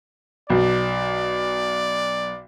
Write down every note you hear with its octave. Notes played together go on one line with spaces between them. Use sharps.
B1 D5